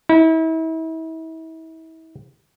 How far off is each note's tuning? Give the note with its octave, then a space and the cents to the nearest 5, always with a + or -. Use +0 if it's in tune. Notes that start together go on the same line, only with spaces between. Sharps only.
E4 -35